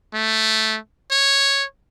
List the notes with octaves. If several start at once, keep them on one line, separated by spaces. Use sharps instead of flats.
A3
C#5